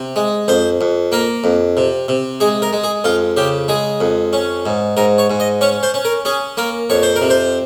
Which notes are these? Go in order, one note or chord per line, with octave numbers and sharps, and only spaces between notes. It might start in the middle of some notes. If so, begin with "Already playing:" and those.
Already playing: C3
G#3
F2 C5
F2
A#3 A#4
F2
C3
C3
G#3 G#4
A#4
G#3
G#4
F2 F4
C#3 G4
G#3 G#4
F2
C#4
G#2
G#2 A#4
C#5
G#2
D#5
C#4 C#5
C5
C#4
A#4
C#4 G#4
A#3 A#4
F2 C#5
C5
A#4
C3
C5